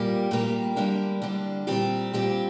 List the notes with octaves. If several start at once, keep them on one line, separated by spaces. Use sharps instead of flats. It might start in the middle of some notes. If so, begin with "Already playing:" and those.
Already playing: A#2 G3 A#3 G4
A#2 G3 A#3 G4
D3 G3 A#3 D4
D3 G3 A#3 D4
A#2 G3 C4 G4
A#2 G3 C4 G4